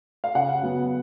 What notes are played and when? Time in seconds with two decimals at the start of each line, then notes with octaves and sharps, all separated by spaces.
0.24 F5
0.35 C#3 F#5
0.62 F#3 B3